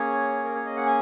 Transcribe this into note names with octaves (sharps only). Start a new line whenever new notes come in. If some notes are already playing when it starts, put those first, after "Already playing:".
Already playing: A#3 C#4 G#4 C#5
A#4
C#5
D#5
F#5
G#5